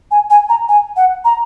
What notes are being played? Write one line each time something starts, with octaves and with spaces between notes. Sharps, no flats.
G#5
G#5
A#5
G#5
F#5
A#5